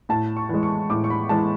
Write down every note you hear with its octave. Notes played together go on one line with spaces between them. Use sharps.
A2 A5
C#6
E3 G#3
C#6
A2 D6
C#6
B5
E3 G#3 A5